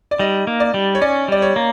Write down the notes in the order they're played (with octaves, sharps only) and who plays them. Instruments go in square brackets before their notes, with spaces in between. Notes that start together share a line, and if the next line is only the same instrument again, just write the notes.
[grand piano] D5
[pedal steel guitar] G3 [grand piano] D#4 D#5
[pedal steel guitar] A#3
[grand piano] D5
[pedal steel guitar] G3
[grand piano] C#5
[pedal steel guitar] C#4 [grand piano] D5
[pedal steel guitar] G3 [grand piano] D5
[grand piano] C#5
[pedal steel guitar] A#3